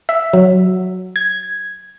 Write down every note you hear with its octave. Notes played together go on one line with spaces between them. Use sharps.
E5
F#3
G#6